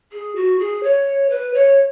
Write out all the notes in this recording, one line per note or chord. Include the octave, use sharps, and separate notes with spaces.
G#4
F#4
G#4
C#5
B4
C#5